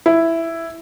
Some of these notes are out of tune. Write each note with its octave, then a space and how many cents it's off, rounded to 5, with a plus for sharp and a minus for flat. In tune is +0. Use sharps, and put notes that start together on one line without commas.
E4 +5